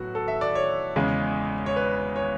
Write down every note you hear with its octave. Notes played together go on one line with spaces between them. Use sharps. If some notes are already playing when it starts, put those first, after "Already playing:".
Already playing: A2 F#3 B3 F#4
A4
E5
D5
C#5
E2 C#3 G#3
C#5
B4
C#5